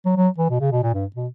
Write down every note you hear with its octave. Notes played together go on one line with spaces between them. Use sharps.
F#3
F#3
E3
B2
C#3
B2
A#2
G2
B2